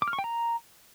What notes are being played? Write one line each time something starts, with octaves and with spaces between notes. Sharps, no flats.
D6
F6
C#6
G5
A#5